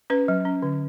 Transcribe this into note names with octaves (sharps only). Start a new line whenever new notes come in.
C#4 B4
F#3
C#4
D3